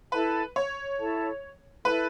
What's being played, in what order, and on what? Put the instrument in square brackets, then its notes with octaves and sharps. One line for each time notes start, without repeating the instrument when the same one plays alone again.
[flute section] E4 A4 E5 A5 [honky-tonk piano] B4
[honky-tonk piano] C#5
[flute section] E4 A4 E5 A5
[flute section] E4 A4 E5 A5 [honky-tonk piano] B4